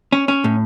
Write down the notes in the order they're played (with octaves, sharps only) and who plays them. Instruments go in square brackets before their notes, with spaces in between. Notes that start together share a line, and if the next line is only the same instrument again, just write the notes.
[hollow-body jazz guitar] C#4
C#4
A2